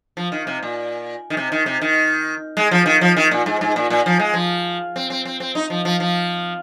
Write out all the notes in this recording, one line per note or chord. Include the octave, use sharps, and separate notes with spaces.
F3
D#3
C3
A#2
D#3
C3
D#3
C3
D#3
G#3
F3
D#3
F3
D#3
A#2
G#2
G#2
A#2
A#2
F3
G#3
F3
C4
C4
C4
C4
D#4
F3
F3
F3